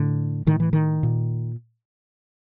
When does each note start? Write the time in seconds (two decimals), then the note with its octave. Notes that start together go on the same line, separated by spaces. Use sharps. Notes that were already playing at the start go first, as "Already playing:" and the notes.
Already playing: A2 D3
0.47 A2 D#3
0.60 E3
0.73 D#3
1.03 A#2